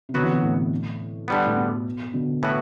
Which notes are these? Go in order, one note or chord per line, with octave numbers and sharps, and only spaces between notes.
C3
B2 D3 F#3 B3 F#4 B4
C3 E3
B2
A2
D3 G3 B3
A2
B2
B2 D3
A2 E3 B3 F#4 B4